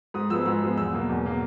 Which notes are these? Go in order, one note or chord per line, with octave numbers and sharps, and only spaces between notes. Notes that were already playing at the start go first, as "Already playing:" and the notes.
G#2 D#6
F3 G#3 B3 E6
G#2 E6
F3 G#3 B3
E2 E6
B2 F#3 A#3
E2
B2 F#3 A#3